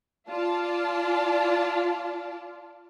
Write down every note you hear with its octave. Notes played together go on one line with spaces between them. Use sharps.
F4 D5 A5